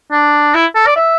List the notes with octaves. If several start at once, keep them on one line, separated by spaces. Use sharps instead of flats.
D4
E4
A4
D5
E5